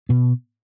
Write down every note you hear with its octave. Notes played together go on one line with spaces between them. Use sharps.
B2 B3